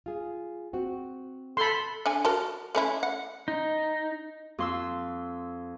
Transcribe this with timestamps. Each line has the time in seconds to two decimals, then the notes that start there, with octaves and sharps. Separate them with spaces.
0.06 F4 G#4
0.73 C4 F#4
1.57 A4 B5 C6
2.06 D3 G#5
2.25 F#4 A4 A#4
2.75 A3 C#4 E4
3.03 F#5
3.48 D#4
4.58 F2 C6 E6